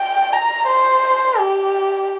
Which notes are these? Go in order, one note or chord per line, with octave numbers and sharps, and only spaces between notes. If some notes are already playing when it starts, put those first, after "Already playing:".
Already playing: G5
A#5
C5
G4